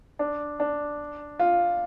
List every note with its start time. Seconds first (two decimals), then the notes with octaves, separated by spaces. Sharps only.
0.19 D4
0.60 D4
1.39 F4